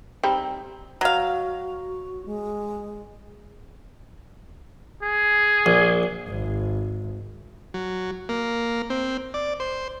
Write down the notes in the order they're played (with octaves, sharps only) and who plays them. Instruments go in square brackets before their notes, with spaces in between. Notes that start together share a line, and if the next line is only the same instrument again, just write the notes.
[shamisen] G3 C4 D#4
[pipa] F#3 F5 [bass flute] F#4
[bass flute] G#3
[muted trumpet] G#4
[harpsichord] A#1
[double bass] G#1
[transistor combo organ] F#3
A#3
C4
D5
C5